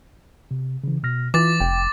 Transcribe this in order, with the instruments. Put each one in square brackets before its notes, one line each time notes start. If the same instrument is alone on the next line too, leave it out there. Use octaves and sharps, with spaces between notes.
[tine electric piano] C3
C#3 E3
B2 F6 A#6
[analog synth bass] E3 [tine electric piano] F4 [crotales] D6 A6
[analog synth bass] F1 [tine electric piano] G5